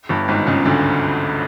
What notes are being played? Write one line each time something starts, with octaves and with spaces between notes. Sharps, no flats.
G1 G2
G#1 G#2
C#2 C#3
D2 D3